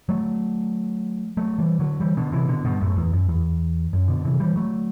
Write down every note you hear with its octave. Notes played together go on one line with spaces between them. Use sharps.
F#3 A3
F#3 A3
E3 G3
D3 F#3
E3 G3
B2 D3
C3 E3
B2 D3
G2 B2
F#2 A2
E2
F#2
E2
F#2
B2 D3
C3 E3
E3 G3
F#3 A3